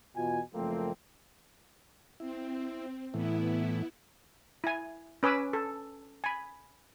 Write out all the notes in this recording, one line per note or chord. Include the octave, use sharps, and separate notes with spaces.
E2 B2 F4 G#5
F#1 F3 A3 A#3 C4
C4 E4
A2 E3 B3 E4
E4 G#5
C#4 B4 G#5 D6 E6
A4
G#5 B5